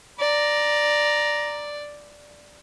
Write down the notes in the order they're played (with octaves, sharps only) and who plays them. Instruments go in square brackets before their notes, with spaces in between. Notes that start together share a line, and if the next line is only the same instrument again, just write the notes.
[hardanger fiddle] D5 [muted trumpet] A#5